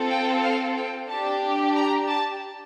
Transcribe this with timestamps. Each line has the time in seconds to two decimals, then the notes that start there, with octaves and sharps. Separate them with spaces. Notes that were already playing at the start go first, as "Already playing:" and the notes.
Already playing: C4 F4 A4
0.10 G5
0.42 F5
0.76 G5
1.08 D4 G4 A5
1.75 A#5
2.08 A5